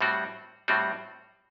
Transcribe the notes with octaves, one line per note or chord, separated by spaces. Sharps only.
A2 G3 C4 F#4
A2 G3 C4 F#4